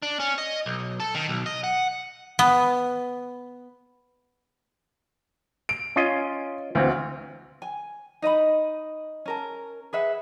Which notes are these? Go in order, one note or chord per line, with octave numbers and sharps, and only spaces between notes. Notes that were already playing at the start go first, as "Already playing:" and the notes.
D4
C#4
D#5
B1
A4
D#3
B1
D#5
F#5
B3
D7
C#4 F4 D#5
D2 E3 C4 F5
G#5
D#4 D#5 E5 B5
C#4 A#4 A5
G#4 B4 E5 F#5